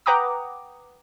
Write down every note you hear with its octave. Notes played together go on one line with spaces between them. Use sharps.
B4 F#5 G5 A#5 D6 D#6